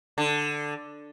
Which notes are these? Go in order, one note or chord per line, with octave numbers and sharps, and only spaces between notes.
D3